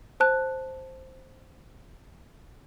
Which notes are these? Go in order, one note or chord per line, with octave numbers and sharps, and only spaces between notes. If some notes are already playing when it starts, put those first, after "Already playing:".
C5 A5 F#6